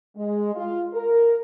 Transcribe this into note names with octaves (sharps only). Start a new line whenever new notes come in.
G#3
F4
A#4